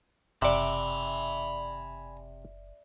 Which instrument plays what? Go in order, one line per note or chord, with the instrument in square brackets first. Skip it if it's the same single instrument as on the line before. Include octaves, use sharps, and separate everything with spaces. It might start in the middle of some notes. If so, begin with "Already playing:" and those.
[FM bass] F#1 [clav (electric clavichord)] C3 F#5 [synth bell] D5 E5 [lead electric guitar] G#5 B5